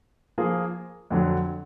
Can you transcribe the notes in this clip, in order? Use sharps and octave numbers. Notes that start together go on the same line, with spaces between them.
F3 A#3 F4 G#4
F2 D3 F#3